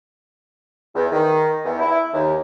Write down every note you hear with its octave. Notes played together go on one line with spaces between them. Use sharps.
E2
D#3
E2
E4
D#2